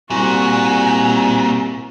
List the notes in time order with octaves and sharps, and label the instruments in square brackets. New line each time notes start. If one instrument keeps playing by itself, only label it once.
[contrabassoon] C2 [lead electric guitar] A#2 [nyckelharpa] F#4 [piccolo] G#5